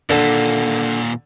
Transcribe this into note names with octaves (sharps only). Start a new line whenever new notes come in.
D#2 A#2 D3 A4